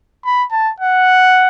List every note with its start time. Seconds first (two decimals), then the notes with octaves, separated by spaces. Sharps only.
0.24 B5
0.52 A5
0.80 F#5